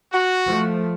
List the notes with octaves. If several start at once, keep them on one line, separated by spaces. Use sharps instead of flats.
F#4
F3 A3